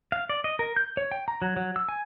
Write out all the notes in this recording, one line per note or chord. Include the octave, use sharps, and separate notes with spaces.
F5
D5
D#5
A#4
G6
C#5
G5
A#5
F#3
F#3
E6
G#5